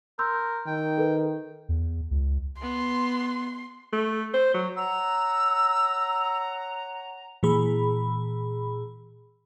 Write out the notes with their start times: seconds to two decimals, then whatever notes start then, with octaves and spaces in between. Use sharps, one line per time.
0.19 A#4 C6 E6 G6
0.67 D#3 G5
0.98 A4 B4
1.69 E2
2.11 C#2
2.62 B3 C6
3.93 A3
4.34 C5
4.54 F#3
4.76 C#5 F#5 A#5 E6
7.43 A#2 E3 G#4 B5